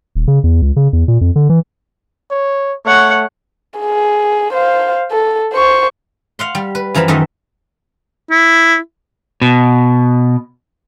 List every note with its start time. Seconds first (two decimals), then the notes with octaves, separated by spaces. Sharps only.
0.15 D#1
0.28 C#3
0.44 E2
0.62 C#2
0.76 C#3
0.93 E2
1.08 A#2
1.21 F2
1.36 D3
1.49 E3
2.31 C#5
2.85 A3 C#5 F#5
3.79 G#4
4.53 C5 F5
5.11 A4
5.53 C5 C#6
6.39 F5 F#5 C6
6.55 G3
6.75 B4
6.94 F#2 E3 F3 A#4 B5
7.08 F#2 D#3 A3 D#5 E5
8.31 E4
9.42 B2